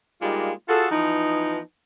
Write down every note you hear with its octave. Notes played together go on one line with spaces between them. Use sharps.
G3 G#3 A#3 D4 D#4 F4
F4 F#4 G#4 A4
E3 F3 B3 D#4